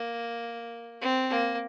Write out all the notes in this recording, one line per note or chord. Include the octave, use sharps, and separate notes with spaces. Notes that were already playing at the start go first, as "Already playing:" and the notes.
Already playing: A#3
C4
A#3